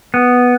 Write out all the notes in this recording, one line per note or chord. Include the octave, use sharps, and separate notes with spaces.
B3